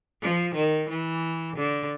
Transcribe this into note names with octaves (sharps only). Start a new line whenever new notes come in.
F3
D#3
E3
D3